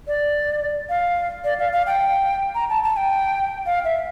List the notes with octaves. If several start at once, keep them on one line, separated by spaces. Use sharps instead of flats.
D5
F5
D5
F5
F5
G5
A#5
A5
A5
G5
F5
E5